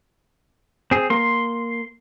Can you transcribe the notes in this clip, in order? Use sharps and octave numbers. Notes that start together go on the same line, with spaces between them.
C4 G#4
A#3 C6